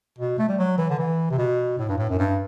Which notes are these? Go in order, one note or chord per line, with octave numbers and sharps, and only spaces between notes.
B2
A3
G3
F#3
E3
D3
E3
C3
B2
A2
G2
A2
F#2
G2